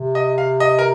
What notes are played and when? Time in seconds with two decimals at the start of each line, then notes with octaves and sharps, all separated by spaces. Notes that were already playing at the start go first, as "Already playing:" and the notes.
Already playing: C3
0.15 D#5
0.38 F5
0.60 D#5
0.79 A#4